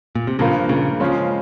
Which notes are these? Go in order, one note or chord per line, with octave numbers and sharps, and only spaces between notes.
A#2
C3
G2 A#2 C#3 F3 A#3 F4 A#4
A#2 C#3
C#3 F3 G#3 C#4 F4